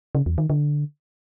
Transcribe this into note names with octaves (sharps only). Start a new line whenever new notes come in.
C#3
E2
D#3
D3